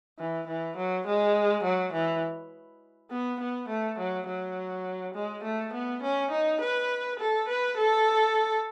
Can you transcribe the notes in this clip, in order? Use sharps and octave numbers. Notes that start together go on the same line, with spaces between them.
E3
E3
F#3
G#3
F#3
E3
B3
B3
A3
F#3
F#3
G#3
A3
B3
C#4
D#4
B4
A4
B4
A4